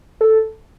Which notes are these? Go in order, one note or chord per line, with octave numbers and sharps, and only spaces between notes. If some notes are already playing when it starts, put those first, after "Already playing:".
A4